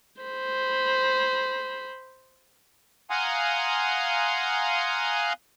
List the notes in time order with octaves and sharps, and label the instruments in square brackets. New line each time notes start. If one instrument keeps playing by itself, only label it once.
[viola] C5 B5
[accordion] F5 F#5 G#5 A#5 C6 D#6